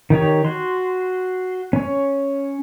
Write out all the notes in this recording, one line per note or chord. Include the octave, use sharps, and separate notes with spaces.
D#3 D#4 G4 C#5
F#4 C6
C#4 C#5